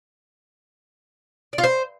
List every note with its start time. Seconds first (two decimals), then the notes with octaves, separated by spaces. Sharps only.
1.53 D5
1.58 F4
1.64 C5